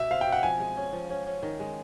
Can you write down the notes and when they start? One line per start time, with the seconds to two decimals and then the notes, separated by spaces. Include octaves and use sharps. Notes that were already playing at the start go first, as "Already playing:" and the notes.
Already playing: B2 E5
0.11 C4 F5
0.21 G5
0.27 B2
0.32 F#5
0.43 F3 G#5
0.60 G#3
0.77 C#4
0.93 F3
1.10 C#4
1.26 C#4
1.43 D#3
1.60 G#3